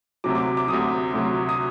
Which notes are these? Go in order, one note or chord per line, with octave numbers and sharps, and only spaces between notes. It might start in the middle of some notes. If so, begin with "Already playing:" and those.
D2 C3 F#3 D6
D6
D6
D2 C3 F#3 D#6
D2 C3 F#3
D#6